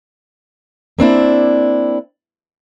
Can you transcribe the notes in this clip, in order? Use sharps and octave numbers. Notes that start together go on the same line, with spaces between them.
A#3 C4 D4 E4